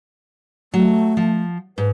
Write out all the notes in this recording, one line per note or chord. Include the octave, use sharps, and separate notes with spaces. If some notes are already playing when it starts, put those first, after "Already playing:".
F#3 A3
F3
G#2 B4